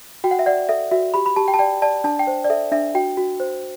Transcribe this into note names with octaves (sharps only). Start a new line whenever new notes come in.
F#4 G5
F#5
E5
D5 F#5
A4 E5
F#4 E5
G4 B5
B5
G4 A5
G5
A5
D5 G5
D5 A5
D4 A5
G5
C5
D5
A4 E5
D4 E5
F#4 G5
F#4
C5